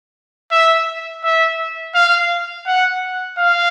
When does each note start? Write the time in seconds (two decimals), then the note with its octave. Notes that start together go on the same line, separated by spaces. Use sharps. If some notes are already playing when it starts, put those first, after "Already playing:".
0.52 E5
1.24 E5
1.95 F5
2.67 F#5
3.38 F5